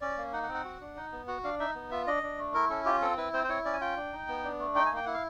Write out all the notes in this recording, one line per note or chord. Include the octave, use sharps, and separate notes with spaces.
C#4 D5
A#3
D#4 F#5
F#5
C4
F#5
F#4
D4
D#4
B3
F#4 F#5
D4 F5
D#4 E5
B3
F4 E5
D4 D#5
D4
A3
E4 A#4
C#4 A4
F4 G4
C4 A4
E4 B4
C4 C5
C5
E4 C#5
C#4 D5
G#5
F4 G5
D4
D#4
B3
D4
A3
D#4 G5
G#5
A#3 G5
E4 F#5
F5